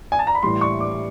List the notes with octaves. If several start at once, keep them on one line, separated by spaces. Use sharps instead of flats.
G#5
A5
A#5
B5
A2 E3 G3 C6
C#6
D6